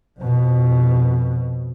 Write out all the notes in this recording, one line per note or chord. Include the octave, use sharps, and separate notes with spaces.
F2 B2